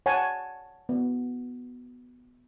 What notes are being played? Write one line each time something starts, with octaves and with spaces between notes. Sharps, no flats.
C#5 F#5 G#5 A5
B3